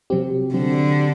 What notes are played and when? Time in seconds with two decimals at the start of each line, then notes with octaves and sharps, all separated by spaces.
0.10 C3 F#3 C4 G4
0.54 D3 F#3 C4 G4